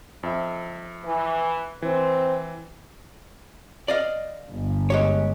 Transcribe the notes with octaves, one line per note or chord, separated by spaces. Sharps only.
F2 E5
E3
E3 C4
D5 D#5 F5
G1
G#3 G4 C#5